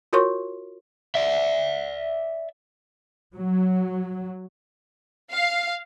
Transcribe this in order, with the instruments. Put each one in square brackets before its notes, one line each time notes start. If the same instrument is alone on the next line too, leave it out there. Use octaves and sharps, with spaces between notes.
[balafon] F4 F#4 A#4 C#5 C6 C#6
[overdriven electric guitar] D5 E5
[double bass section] F#3
[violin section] F5